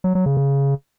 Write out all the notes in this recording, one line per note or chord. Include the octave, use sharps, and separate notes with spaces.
F#3
F#3
C#3
C#3